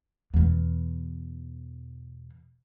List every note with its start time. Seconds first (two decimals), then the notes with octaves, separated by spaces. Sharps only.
0.34 E2 B2